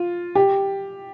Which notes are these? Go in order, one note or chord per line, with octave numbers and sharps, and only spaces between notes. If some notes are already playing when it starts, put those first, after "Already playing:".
Already playing: F4
G4